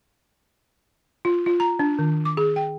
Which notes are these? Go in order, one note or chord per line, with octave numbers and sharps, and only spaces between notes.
F4
F4
A#5
D4
D#3
D6
G#4
G5